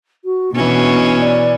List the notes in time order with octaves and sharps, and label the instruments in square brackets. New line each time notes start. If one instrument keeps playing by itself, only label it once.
[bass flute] F#4
[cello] B2 [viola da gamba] E3 C#4 [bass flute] D4
[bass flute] D5